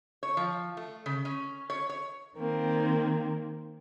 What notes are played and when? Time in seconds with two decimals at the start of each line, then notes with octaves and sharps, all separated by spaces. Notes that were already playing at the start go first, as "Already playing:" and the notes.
0.23 C#5
0.37 F3
0.77 A3
1.06 C#3
1.25 C#4
1.70 C#5
1.89 C#5
2.35 D#3 A#3 C4